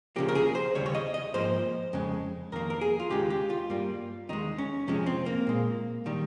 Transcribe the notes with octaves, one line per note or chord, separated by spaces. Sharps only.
C#2 C#3 F3 A#3 G4
A#4
G#4
C5
D#2 C#3 G3 C#5
C#5
D#5
D#5
G#2 F3 A#3 C5
F2 C#3 G#3
F2 D#3 A#3 A#4
A#4
G#4
F4
D#2 C#3 G#3 G4
G4
F4
G2 G3 A#3
D#2 D#3 G#3 D#4
C#4
F2 C3 F3 G#3 C#4
C4
A#3
A#2 G#3
D#3 G3